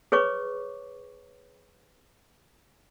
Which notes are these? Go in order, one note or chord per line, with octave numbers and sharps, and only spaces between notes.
G#4 B4 C#5 C#6 D6